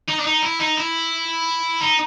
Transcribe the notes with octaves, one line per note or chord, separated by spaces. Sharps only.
D#4
D4
D#4
E4
D#4
E4
D#4